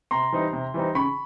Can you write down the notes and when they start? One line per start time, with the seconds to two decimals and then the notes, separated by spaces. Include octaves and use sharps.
0.11 C3 A#5 C6
0.32 E3 G3 C4 D#4
0.53 C3
0.74 E3 G3 C4 D#4
0.95 C#3 B5 C#6